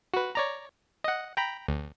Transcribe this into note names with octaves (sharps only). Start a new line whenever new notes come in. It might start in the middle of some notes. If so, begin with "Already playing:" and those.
F#4 B4
C#5 D5 A#5
D#5 F#5
G5 A#5 B5
D2